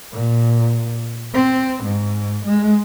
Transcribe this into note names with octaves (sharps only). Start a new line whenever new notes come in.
A#2
C4
G#2
G#3